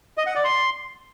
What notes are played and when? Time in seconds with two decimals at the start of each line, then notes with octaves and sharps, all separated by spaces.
0.17 D#5
0.26 F#5
0.35 D5
0.44 C6